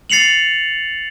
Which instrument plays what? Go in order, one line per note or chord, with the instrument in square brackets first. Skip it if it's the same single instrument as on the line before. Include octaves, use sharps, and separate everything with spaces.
[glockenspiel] A6 C7 C#7 F7 F#7